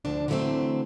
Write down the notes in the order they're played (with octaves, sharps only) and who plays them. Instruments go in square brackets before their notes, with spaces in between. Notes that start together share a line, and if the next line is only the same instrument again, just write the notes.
[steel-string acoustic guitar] D2 D3 F3 D4
D3 E3 F#3 G#3 A3 C4